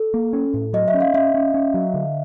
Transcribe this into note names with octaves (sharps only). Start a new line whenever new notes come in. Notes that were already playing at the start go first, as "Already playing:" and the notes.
Already playing: A4
A#3
C#4
A2
F#3 D#5
E5
C#4
F5
C#4 E5
C#4
C#4
F#3
D3